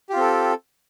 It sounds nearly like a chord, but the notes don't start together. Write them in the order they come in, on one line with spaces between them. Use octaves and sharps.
G4 F4 C4 A4